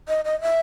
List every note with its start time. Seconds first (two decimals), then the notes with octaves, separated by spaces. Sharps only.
0.08 D#5
0.25 D#5
0.41 E5